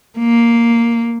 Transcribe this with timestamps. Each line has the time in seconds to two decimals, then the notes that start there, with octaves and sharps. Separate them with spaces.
0.18 A#3